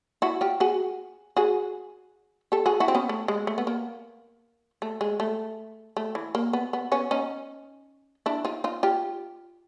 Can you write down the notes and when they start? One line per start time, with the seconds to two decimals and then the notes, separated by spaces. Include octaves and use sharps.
0.22 E4 F#4
0.41 F4 G4
0.60 F#4 G#4
1.37 F#4 G#4
2.52 G4 A4
2.66 F#4 G#4
2.80 E4 F#4
2.88 C4
2.95 B3 C#4
3.09 A3
3.28 G#3
3.47 A3
3.58 B3
3.67 A#3
4.82 A3
5.01 G#3
5.20 A3
5.97 A3
6.15 E3
6.35 A#3
6.53 B3
6.73 B3
6.92 B3 C#4
7.11 C#4 D#4
8.26 D4 E4
8.45 D#4 F4
8.64 D#4 F4
8.83 F4 G4